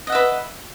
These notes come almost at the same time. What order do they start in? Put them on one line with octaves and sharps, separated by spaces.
D#5 F#5 E5 B4